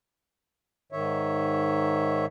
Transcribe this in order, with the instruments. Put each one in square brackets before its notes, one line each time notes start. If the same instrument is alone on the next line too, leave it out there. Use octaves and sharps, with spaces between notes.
[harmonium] G#2 D#3 C#5 E5